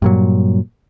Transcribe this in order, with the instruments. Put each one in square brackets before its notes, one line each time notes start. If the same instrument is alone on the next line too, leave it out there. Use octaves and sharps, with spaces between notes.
[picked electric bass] G2 A#2 F#3